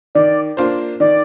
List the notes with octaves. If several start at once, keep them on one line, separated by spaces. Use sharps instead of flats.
D#3 D5
A#3 D4 F4 C5
D#3 D5